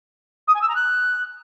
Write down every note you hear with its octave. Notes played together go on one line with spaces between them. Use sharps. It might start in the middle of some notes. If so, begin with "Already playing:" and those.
D#6
G#5
E6
A#5
F#6